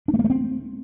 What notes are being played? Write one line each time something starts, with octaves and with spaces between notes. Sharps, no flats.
D4
A3
A#3
A3
C4